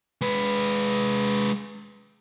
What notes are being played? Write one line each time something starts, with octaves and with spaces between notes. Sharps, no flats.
G#3 B4